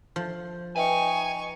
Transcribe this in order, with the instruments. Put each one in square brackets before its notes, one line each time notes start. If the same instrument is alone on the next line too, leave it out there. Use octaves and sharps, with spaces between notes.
[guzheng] F3
[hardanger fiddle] D#4 C#6 [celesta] B4 E5 G5 [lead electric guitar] G#5